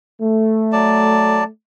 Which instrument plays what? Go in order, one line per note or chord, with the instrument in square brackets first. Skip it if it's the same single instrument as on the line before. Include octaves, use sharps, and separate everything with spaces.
[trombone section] A3
[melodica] F#3 D5 A5